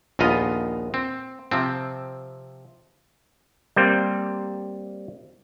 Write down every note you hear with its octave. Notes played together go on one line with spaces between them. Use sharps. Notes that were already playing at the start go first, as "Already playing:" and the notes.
A#1 D#2 B3 F4 D#5 F5
C4
C3 F3 C4
G3 A#3 C4